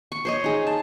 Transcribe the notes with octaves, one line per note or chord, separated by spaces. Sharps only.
C#6
C5 C#5 D#5
D#4 G#4
A5